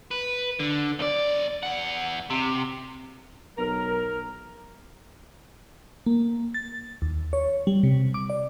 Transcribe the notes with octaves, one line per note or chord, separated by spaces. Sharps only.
B4
D3
B1 D5
E2 F#5
C3
B1 A#4
A#3
A6
D#2
C#5
G3
C3
D6
D5